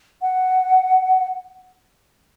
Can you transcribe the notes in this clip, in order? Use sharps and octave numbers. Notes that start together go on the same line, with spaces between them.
F#5